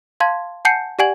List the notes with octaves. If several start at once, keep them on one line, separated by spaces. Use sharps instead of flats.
F5 A5 C6 G#6
F#5 G#5 A5 G6 C7 C#7
G4 D5 F#5 G#5 G#6 F#7